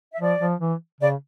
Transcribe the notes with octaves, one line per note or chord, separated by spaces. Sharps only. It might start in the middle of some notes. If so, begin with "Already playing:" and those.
E5
F3 D5
F3
E3
C#3 D5